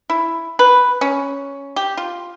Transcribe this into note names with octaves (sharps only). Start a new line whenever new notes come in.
E4
B4
C#4
G4
F4